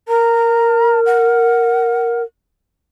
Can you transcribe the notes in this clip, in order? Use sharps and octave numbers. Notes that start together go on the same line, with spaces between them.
A#4 A#5
F#5